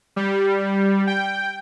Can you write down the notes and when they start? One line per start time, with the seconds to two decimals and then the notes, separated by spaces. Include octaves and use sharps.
0.16 G3
1.07 G5